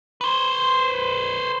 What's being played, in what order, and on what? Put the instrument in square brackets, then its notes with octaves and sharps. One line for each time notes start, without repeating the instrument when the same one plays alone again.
[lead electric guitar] B4 C5